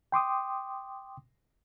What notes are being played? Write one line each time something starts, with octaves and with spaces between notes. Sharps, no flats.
G5 C6 D6 D#6